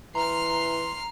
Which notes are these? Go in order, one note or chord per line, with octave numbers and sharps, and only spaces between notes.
E3 A#5 C6 F6 C7